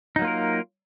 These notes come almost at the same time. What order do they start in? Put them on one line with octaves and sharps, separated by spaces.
D#4 F#3 A#3 F4 A#4